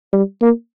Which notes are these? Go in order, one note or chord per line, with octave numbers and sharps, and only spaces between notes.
G3
A#3